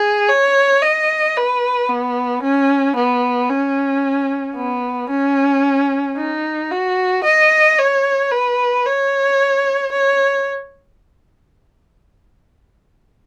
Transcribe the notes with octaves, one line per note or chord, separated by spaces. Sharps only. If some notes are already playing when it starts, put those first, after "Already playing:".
Already playing: G#4
C#5
D#5
B4
B3
C#4
B3
C#4
B3
C#4
D#4
F#4
D#5
C#5
B4
C#5
C#5